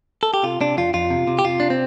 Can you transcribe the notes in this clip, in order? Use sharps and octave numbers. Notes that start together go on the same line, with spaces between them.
A4
G4
C3 F4
C3 D4
F2 F4
F2 F4
C3
C3
G4
C3 F4
C3 D4
C4